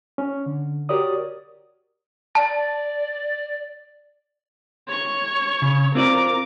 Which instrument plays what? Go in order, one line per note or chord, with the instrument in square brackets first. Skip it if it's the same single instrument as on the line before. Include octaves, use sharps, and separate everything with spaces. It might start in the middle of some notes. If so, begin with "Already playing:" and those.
[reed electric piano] C#4
D3
F#4 G4 A#4 C#5 D5 D#6
[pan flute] D5 [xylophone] A5
[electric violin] C#5 C#6
[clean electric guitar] C#3
[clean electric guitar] C4 F4 D5 [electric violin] A#4 D6